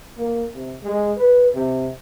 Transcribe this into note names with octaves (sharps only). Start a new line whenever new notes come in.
A#3
C3
G#3
B4
C3